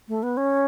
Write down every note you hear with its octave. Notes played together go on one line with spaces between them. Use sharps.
A3
B3
C#4